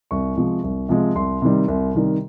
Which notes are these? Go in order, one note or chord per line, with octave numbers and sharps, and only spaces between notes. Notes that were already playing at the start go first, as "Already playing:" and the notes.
C2 C#6
C3 F3 G#3
C2
C3 F3 G#3
C2 C6
C3 D#3 G3
C2
C3 D#3 G3